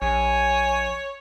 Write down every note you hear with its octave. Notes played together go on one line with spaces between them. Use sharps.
A#1 C#5 G#5